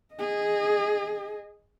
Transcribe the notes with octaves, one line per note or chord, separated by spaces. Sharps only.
G#4 D#5